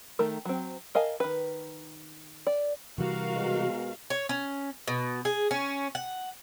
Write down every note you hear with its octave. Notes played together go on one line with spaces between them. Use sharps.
D#3 A3 A#4
F#3 C4
A#4 D#5 F5 G#5 A5
D#3 B4
D5
C3 E3 G3 F#4 A#4 F5
B2 G#3
C#5
C#4
B2
G#4
C#4
F#5